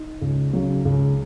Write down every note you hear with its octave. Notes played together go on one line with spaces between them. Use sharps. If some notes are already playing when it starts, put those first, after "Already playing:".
Already playing: D#4
C#2
C#3 F#3
C#2